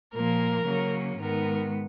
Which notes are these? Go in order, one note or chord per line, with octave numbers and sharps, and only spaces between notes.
A#2 F3 A#3 A#4
C#3 F#3 A#3 C#4
G#2 D#3 G#3 B3 A#4